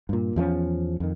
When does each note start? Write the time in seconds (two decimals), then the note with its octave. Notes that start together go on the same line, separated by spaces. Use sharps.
0.09 G2 A#2
0.36 E2 F3 G#3 C#4
1.00 F2 D#3